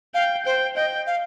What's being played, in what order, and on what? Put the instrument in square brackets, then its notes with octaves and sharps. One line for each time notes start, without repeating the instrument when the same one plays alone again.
[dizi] F5 [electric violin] G5
[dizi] C5 [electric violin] G5
[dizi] D#5 [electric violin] G5
[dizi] F5